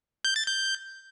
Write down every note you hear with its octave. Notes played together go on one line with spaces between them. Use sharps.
G6
A6
G6